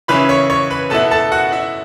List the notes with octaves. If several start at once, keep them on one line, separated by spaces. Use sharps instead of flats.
C#3 E3 C#4 E4 B4 B5
C#5 C#6
C#5 C#6
B4 B5
B2 B3 E4 A4 A5
A4 A5
F#4 F#5
E4 E5